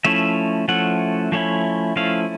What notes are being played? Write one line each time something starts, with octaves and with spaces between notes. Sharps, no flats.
F3 A3 C#4 E4 E5
F3 A3 C#4 E4 F#5
F3 A3 C#4 E4
F3 A3 C#4 E4 F5